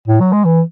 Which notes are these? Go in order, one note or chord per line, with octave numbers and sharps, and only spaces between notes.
A2
F#3
G#3
E3